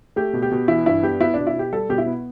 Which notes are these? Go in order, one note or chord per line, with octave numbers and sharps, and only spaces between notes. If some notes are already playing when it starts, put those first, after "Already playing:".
A3 G4
B2
G4
B2
E3 E4
G2 E4
B3 G4
B3 E4
B2 D4
E4
B2 G4
G3 A4
B2 G4
E4
B3